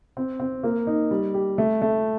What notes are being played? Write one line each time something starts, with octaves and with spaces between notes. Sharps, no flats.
C4
C4
A#3
D#4
G3
G4
A3
A3